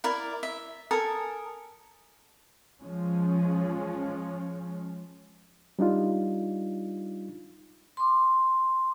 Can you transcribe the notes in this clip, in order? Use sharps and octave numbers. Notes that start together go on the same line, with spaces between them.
E4 A#4 D5
E5
A4 A#4 G#5 D#6
F3 G#3 C#4
G3 D4 D#4 F4
C6 D6